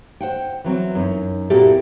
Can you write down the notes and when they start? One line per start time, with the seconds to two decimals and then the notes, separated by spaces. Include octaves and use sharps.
0.21 C5 F#5 G5
0.64 E3 F#3 C4
0.95 F#2 D#4
1.50 A#2 C4 E4 F#4 G4 A4